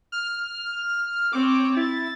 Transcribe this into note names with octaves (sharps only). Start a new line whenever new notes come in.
F6
C4 C#5 D6
E4 A6